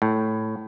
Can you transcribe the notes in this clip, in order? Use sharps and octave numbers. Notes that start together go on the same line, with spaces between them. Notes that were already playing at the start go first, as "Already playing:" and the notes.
A2